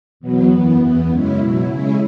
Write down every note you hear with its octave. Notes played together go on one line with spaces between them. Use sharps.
E2 B2 F#3 B3
F#2 E3 B3
E2 E3 B3
F#2 C#3 G#3 C#4 E4
B2 F#3 E4
C#3 G#3 C#4 E4